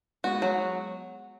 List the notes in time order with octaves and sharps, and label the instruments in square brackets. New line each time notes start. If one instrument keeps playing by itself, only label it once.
[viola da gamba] G#3 B3 [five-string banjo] F#4
[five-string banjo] F#3